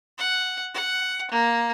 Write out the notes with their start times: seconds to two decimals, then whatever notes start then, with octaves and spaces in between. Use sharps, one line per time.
0.18 F#5
0.74 F#5
1.31 A#3